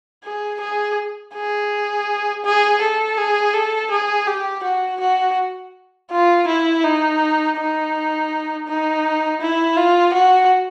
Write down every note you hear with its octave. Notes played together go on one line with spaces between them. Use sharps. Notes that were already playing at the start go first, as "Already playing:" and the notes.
G#4
G#4
G#4
G#4
A4
G#4
A4
G#4
G4
F#4
F#4
F4
E4
D#4
D#4
D#4
E4
F4
F#4